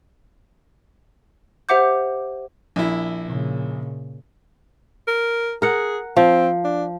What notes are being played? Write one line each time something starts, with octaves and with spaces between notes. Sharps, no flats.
G4 C5 E5 F#5 D6 G6
A#1 E4
A#2 C#3
A#4
G#4 A#4 F#5
F3 C4
D4